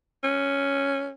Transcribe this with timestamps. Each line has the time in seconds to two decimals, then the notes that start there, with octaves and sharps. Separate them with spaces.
0.23 C#4